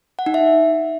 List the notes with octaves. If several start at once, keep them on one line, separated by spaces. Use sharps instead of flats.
F#5
D#4
E5